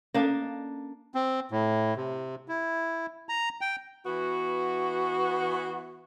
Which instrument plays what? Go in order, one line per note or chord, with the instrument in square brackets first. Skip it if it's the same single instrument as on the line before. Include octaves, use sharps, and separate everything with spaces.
[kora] A#3 D4 [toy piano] C#4 A4 F5
[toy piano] D#5
[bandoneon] C4
A2
C3
E4
A#5
G5
[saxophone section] E3 B3 F#4